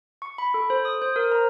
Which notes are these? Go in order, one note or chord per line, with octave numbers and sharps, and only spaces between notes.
C#6
B5
A4
C5
D#6
C5
A#4
A#5